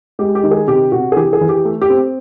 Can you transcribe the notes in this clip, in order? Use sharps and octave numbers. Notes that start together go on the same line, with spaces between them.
G#3 G4
G4
D#3
G#4
C3 G4
C3 F#4
G#4
E3 G4
G#4
E3
G4
A3
G4
C4